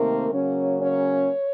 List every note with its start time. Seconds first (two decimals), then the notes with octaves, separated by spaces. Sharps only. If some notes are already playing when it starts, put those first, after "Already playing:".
Already playing: C3 D#3 A3 A#3 C4 A#4
0.31 C#3 F#3 A#3 C#4
0.82 C#4 C#5